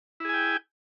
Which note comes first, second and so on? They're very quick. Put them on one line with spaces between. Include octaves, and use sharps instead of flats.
E4 G#4 G#5 G5